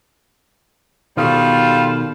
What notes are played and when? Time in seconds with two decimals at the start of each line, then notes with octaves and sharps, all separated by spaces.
1.17 B2 D#3 G3 F4 A4